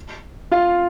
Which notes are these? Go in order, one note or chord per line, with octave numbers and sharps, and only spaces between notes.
F4 F5